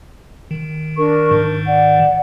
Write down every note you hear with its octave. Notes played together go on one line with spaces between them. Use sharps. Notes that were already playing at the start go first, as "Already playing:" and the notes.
D#3
D4 A#4 C#6
G#2 D#3
D5 F#5